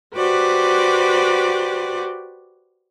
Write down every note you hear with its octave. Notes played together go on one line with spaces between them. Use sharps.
F#4 G4 B4 C5 D5